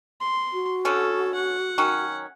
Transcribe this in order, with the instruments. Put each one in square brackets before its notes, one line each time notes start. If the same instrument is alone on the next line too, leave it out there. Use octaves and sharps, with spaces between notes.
[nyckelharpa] C6
[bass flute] F#4
[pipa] D3 C#4 [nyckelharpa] A4
[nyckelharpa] F#5
[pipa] D#3 F#3 C#4